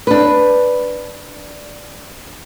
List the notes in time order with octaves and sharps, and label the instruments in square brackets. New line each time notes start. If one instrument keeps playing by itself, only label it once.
[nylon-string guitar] D4 B4